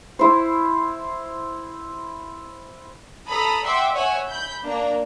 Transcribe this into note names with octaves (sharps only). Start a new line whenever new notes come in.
E4 C5
A4 A#5 B5 D#6
E5 F#5 G5 C6 D6
C#5 E5 F#5 G#5
B5 G6
A#3 D4 A#5